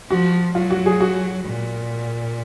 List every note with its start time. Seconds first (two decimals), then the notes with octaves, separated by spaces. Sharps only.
0.10 F3 F#4
0.55 F#3 F4
0.71 F#4
0.86 G#4
1.01 F#4
1.46 A#2